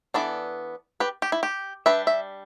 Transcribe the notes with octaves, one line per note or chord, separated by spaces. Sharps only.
E3 B3 D4 A4 D5
G4 B4
G4
E4
G4
G3 D4 B4 E5
E5